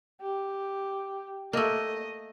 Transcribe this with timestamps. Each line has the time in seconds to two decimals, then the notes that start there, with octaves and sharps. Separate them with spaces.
0.21 G4
1.53 A3 A#3 D#5